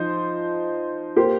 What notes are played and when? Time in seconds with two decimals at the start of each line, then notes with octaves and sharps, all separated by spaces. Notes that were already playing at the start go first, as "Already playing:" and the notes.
Already playing: F3 D#4 C5
1.16 A#3 G4 C5